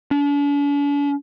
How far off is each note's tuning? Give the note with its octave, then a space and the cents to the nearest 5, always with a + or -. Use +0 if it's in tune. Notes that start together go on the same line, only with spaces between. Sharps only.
D4 -45